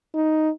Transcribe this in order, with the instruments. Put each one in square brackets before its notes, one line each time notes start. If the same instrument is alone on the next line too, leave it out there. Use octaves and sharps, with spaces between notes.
[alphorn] D#4